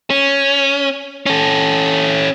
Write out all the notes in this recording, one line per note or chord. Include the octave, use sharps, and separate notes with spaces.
C#4
C#4 A4